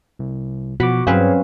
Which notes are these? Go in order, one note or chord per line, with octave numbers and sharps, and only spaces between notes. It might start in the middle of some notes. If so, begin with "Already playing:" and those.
C2
B2 F3 F#4 F#5 B5 D6
G2 F#3 C4 C#4 G#4 B4 C#5 F5